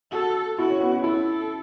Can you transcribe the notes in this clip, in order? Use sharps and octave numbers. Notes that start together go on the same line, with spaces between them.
F#4 A4
E4 F#4
C#4
B3
C#4
E4 A4